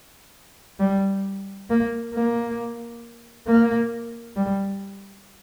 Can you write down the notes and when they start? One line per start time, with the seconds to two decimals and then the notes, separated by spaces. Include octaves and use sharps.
0.80 G3
1.70 A#3
2.15 A#3
3.48 A#3
4.36 G3